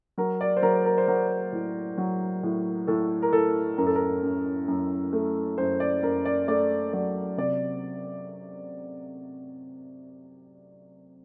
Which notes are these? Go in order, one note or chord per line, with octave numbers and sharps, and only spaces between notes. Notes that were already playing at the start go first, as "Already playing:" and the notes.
F#3 A#4
D5
C5
F#3 A#4
A#4
C5
F#3 A#4
A2
F#3
A2
A2 A4
A#4
A2 A4
F#2 A#4
A4
A#4
F#2
F#2
A3
F#2 C5
D5
F#2 A#4
D5
A3 D5
F#3 D5
C3 D5